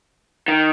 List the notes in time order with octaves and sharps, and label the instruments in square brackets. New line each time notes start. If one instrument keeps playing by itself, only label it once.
[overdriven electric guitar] D#3